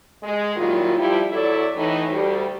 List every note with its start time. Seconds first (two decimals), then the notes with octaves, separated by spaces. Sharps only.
0.22 G#3
0.56 A#2 D#3 F#3 G3 E4 F4
0.97 F3 G3 E4
1.31 E2 F#3 E4 A4 D5
1.76 A2 E3 D#4
2.09 D2 G3